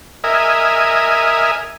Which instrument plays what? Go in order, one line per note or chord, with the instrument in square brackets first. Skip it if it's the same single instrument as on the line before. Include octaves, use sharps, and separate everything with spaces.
[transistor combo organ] A#4 D#5 E5 G#5